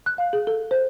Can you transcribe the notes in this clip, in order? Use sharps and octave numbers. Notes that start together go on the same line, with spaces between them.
F#6
F5
G#4
A4
C5